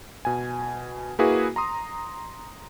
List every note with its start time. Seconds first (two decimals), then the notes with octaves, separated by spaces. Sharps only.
0.25 B2 G#5
1.19 A#3 E4 F#4 G#4 B4
1.56 A#5 C6 D#6